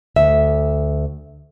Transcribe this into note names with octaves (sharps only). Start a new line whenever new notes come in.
D2 E5